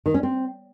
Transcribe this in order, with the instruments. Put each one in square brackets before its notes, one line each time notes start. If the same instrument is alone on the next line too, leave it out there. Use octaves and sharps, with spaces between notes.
[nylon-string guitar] D#3
C#4
C4